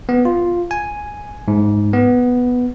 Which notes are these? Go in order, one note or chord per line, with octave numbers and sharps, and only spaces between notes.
B3
F4
G#5
G#2
B3